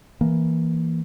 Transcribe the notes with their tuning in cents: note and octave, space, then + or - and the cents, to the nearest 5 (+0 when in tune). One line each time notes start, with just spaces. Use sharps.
E3 +0 A#3 +0